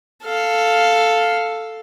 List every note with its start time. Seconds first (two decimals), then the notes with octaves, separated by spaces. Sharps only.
0.25 A4 F5